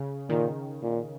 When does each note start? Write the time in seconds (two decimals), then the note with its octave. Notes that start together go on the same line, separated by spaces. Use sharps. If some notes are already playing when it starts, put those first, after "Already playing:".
Already playing: C#3
0.29 A#2 D#3
0.83 A#2